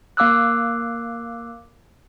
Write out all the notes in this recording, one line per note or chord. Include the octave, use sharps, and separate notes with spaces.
A#3 F5 D6 E6 F#6